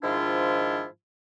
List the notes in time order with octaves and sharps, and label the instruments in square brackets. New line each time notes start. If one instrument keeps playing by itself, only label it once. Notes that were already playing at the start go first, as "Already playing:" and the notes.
[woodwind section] G#2 D#3 F3 D4 E4 F4